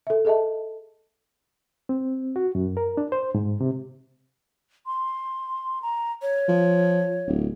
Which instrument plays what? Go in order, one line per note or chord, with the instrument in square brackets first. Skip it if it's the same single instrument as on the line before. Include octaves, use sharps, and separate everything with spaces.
[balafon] A4 E5
G#4 A4 D#5 E5 A5
[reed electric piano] C4
F#4
F#2
A#4
D4
C5
G#2
C3
[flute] C6
A#5
C#5
[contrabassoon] F3
D1